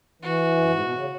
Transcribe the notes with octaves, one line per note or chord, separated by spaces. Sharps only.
E3 F#4
F#2
G#2
B2
C#3